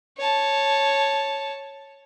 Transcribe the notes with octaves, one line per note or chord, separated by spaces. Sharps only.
C#5 A5